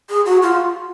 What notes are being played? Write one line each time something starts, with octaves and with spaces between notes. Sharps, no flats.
G#4
F#4
F4